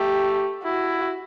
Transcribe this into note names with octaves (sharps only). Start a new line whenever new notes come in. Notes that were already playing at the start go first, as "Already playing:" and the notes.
Already playing: A3 G4
E4 F#4